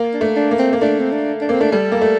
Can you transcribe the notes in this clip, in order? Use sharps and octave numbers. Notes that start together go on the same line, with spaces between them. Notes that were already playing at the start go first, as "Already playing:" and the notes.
Already playing: A#3
D4
A3
D4
A#3
C4
A#3
A3 D4
C4
D4
D4
A#3 C4
A3 D4
G3 A4
A#3
A3